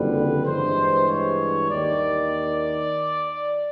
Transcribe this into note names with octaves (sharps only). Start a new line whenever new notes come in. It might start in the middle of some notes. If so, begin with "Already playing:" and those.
Already playing: F#1 F2 D3 G3 B4
G2 E3 G#3 C5
C#5
D#2 D#3 D5